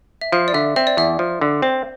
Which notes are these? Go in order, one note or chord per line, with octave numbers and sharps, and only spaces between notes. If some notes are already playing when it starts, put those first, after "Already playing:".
E5
F3 F5
D5
D3 E5
C4 E5
D5
E2 E5
F3
D3
C4 C5